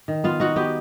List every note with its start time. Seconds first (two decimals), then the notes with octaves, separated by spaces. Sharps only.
0.08 D#3
0.24 B3 F4 F5
0.40 D#4 F#4 F#5
0.56 B3 G4 G5